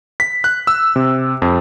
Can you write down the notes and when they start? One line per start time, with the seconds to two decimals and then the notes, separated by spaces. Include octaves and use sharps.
0.20 B6
0.44 F#6
0.67 E6
0.96 C3
1.42 F2